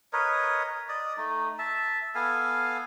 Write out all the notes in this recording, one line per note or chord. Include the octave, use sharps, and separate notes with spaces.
A#4 B4 C#5 D#5
D5 D#5
A3 D#4
E5 A5
B3 A4 F5 G#5